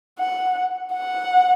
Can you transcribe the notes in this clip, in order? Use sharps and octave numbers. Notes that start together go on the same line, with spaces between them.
F#5
F#5